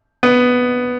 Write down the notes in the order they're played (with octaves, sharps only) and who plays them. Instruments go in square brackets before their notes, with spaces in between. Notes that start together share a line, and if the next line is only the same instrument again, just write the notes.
[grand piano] B3